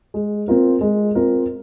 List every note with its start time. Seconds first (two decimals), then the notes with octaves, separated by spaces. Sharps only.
0.14 G#3
0.48 C4 F4 A#4
0.81 G#3
1.15 C4 F4 A#4